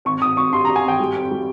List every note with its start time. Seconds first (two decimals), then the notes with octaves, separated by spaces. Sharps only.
0.05 G#1 C#6
0.21 G#1 D#6
0.37 G#1 C#6
0.53 G2 C6
0.65 A#5
0.68 G2
0.76 G#5
0.84 G#1 G5
1.00 G3
1.16 F2
1.31 G3